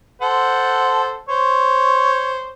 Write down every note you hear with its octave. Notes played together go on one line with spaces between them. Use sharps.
A4 C5 F#5
C5 C#5